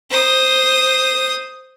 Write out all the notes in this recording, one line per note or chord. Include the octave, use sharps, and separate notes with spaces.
C5 D#6